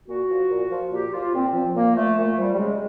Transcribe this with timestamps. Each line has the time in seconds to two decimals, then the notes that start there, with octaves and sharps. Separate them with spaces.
0.08 A#2 F#4
0.30 F3
0.50 A#2
0.72 F3
0.92 A#2 G4
1.13 F3 F4
1.34 A#2 C4
1.54 F3
1.75 A#2 A#3
1.96 F3 A3
2.17 A#2 A3
2.37 F3 G3
2.54 G3
2.58 C#3 G#3